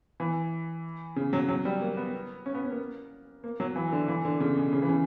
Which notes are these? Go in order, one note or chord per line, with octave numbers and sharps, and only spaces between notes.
E3
C#3
F#3
F#3
G3
A#3
B3
C#4
B3
C#4
A#3
A#3
F#3
E3
D3
E3
D3
C#3
B2
C#3
E3
C#3